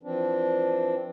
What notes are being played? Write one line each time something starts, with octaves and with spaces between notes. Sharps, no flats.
E3 F3 C4 D4